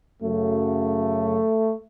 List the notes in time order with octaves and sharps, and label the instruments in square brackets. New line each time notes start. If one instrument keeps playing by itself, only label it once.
[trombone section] F#2 C#3 F#3 A3